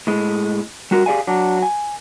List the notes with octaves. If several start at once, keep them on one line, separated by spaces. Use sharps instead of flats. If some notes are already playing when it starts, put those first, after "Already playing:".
A2 G#3
G3 F#4 A#4
G4 G#4 D5 F5 G#5
F#3 D4
G#5